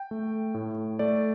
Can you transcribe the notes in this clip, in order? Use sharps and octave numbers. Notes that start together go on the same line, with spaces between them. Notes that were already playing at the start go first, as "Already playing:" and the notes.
Already playing: G5
A3
A2
A3 D5